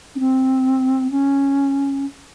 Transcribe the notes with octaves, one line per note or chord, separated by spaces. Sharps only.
C#4
C4
C#4